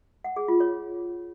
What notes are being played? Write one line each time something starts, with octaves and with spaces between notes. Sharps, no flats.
F#5
G#4
F4
C#5